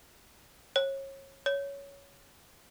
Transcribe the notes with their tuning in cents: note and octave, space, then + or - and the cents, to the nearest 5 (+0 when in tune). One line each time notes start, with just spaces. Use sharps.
C#5 -30
C#5 +10